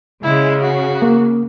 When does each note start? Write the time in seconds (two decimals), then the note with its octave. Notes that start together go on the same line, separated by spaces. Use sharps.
0.23 C#3 G#3 E4
0.61 F#4
1.02 A#3